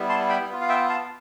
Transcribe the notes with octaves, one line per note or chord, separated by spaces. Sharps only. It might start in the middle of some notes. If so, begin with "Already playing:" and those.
Already playing: G3 B3 E4
A5 C6
G5 B5
B3 F4
F5
E5 G5
F5 A5